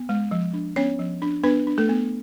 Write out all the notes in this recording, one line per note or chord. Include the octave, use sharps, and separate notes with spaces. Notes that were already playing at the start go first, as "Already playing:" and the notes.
Already playing: B3
G#3
F3
D4
B3 C#4 C#5
F3
D4
B3 D4 B4
D4
A3 A4
B3